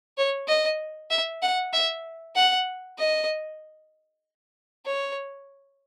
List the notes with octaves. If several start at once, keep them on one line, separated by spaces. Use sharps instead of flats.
C#5
D#5
E5
F#5
E5
F#5
D#5
C#5